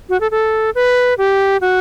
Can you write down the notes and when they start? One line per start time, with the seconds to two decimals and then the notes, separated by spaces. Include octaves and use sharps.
0.09 F#4
0.21 A4
0.31 A4
0.75 B4
1.18 G4
1.61 F#4